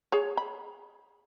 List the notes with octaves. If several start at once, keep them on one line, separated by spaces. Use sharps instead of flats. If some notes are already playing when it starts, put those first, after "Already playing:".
G#4 C#5
B5